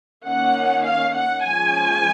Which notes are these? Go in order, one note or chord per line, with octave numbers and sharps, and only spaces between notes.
D#3 A#3 C#4 F#5
F5
F#5
F3 G#3 C#4 G#5